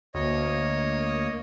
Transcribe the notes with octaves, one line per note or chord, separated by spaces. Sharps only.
D2 A#3 C#5 D#5